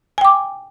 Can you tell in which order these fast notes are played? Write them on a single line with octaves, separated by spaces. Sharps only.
G#5 G5 D6